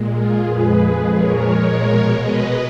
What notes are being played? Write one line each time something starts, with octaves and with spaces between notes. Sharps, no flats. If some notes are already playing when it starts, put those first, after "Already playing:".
Already playing: A#2 G#3
F4 G#4
F2 F3 G#3 G#4 B4
A#2 F3 G#3 A#4 C#5
B2 G#3
B4 D#5